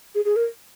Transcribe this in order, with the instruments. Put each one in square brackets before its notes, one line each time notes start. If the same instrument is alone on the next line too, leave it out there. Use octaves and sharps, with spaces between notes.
[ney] G#4
G#4
A#4